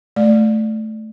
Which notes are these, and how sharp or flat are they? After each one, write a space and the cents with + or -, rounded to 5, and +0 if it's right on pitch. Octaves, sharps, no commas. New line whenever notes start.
A3 -15 D5 +5